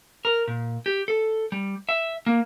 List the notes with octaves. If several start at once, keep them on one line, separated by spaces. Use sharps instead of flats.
A#4
A#2
G4
A4
G3
E5
A#3